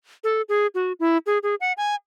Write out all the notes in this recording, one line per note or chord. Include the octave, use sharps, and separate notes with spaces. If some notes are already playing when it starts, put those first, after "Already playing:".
A4
G#4
F#4
E4
G#4
G#4
F#5
G#5